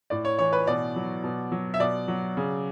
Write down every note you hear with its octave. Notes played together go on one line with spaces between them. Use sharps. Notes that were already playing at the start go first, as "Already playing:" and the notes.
A2 D5
C#5
E3 C#5
B4
B2 D5
F#3
B2
F#3
E5
B2 D5
F#3
C#3